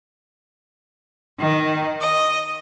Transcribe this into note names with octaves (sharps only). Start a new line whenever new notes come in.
D#3
D#5